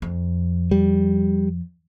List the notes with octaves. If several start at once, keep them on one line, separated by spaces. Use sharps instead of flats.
F2
G3